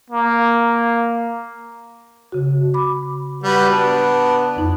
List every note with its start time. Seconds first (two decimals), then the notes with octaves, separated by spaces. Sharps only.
0.11 A#3
2.32 C#3 F#4
2.74 B5 D6
3.43 G3 F#4 B4
3.70 B3 D4
4.57 F2 D#4